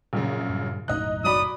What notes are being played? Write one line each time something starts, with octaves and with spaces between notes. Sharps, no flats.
A#1 F#2 C#3
G2
F#1 B1 A2 D#4 D#5 F#6
F#3 D5 B5 D#6